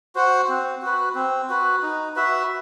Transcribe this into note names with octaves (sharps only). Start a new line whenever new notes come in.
F#4 C5 F#5
C4
F#4 B4
C4
F#4 B4
D#4
F#4 B4 E5